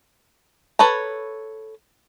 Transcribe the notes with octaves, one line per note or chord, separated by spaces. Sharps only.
A4 B4 C#5 A#5